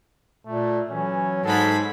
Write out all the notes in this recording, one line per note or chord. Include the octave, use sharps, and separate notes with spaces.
A#2 A3
E3 F#3 C#4
G#2 G#3 A4 B5